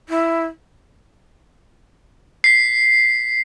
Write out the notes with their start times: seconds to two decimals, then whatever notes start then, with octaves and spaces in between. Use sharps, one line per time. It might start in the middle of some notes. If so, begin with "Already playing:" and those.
0.09 E4
2.44 B6 C7